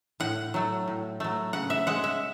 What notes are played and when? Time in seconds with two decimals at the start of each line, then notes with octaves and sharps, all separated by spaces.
0.20 A2 F#5
0.54 F#3 A3
0.88 A2
1.20 F#3 A3
1.53 C#3 F#5
1.70 E5
1.87 G#3 F#5
2.04 E5